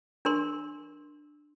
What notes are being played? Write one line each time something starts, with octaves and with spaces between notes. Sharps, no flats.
D4 A#4 C6